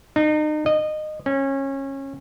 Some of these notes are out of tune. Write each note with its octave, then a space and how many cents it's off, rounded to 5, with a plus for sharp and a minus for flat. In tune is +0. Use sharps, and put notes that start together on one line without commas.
D#4 -35
D#5 -20
C#4 -25